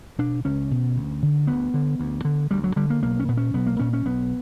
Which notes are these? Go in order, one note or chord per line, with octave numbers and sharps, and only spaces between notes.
B2 D4
C#2 C#4
B2
D2
D3
D2 B3
D3
D2
D3
D2 G3
F#3
D3 G3
A#3
B1 A#3
C#4
A#2 B3
C#4
B1 B3
A#3
A#2 C#4
C#4
B1 B3